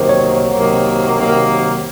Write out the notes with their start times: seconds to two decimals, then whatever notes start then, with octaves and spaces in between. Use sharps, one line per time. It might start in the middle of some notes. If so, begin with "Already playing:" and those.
Already playing: C3 D#3 F#3 A#3 C5
0.09 C#5
0.54 C3 D#3 F#3 A#3
1.18 C3 D#3 F#3 A#3